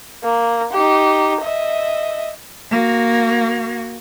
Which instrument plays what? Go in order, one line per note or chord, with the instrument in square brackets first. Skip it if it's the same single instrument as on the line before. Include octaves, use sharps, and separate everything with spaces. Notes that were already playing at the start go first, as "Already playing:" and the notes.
[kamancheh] A#3
D#4 G4
D#5 E5
[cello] A#3 F#4